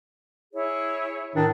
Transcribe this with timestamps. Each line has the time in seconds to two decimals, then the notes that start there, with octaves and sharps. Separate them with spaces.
0.54 E4 G#4 C#5
1.35 A2 D#3 D4